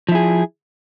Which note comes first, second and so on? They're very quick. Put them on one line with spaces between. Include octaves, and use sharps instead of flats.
F3 E4 G#4